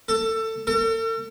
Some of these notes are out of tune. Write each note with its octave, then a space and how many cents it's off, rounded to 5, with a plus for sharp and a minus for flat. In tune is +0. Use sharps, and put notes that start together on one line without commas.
A4 +20
A4 +45